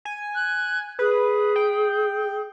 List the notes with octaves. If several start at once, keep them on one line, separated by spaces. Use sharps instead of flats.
G#5
F#6
G#4 B4
G5